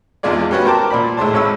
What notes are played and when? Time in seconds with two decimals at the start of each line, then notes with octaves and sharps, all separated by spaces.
0.23 G#1 E2 G#3 F4 G#4 D5
0.51 G3 B3 C#4 F#4 B4
0.65 A#4 C5 G5 A5 D6
0.90 A#2 D5 B5
1.17 A2 G#3 C5 A5
1.33 G#1 G#3 C#5 B5 E6